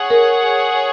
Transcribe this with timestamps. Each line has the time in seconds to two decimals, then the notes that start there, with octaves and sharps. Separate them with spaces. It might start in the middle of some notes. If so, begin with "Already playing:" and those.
Already playing: G#4 C#5 F#5
0.10 A#4